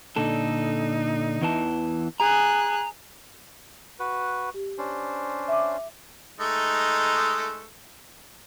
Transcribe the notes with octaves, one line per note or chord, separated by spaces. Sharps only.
A#2 D3 D#4 A4
E2 E3 A5
G#4 A#5 F#6
F#4 B4
G4
C#4 D4 C5
E5 D6
G#3 A3 D#4